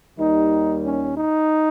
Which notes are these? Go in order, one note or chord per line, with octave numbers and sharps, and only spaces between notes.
D#2 D#3 G3 D#4
C#4
D#4